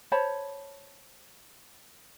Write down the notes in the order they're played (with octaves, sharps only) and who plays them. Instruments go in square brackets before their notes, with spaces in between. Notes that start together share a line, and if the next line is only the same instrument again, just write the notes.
[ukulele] C5 C#5 A5 B5